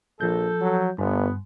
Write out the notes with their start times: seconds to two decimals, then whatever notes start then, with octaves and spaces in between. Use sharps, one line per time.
0.21 A#1 F3 A4 G6
0.61 F#3
0.98 G1 G2 B3